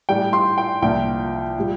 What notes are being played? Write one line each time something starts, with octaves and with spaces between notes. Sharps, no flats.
A2 G3 D4 G5
C6
G5
C2 A#2 F3 A#3 D4 G5
A#2 G3